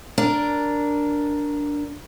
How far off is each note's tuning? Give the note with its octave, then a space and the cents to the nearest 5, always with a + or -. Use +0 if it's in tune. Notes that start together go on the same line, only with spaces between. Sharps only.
D4 -5 A#4 +0